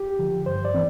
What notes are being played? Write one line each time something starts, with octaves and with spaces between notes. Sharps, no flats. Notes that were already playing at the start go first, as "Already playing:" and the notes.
Already playing: G4
D3 F3
G2 C5
D5
E3 C4